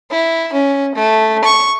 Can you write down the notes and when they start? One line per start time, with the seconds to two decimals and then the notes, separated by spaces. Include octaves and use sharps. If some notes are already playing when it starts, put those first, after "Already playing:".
0.11 E4
0.53 C#4
0.95 A3
1.44 C#6